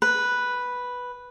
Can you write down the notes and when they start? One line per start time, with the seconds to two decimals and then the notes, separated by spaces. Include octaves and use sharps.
0.02 B4